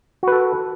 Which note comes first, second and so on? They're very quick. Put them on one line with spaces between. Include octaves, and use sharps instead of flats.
F#4 B4 A4